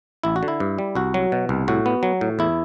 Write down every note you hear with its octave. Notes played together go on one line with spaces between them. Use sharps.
A1 E4
F#4
D3
E4
G2
G3
C2 F#4
F#3
B2
C2
A2 F#4
B3
F#3
A2
E2 E4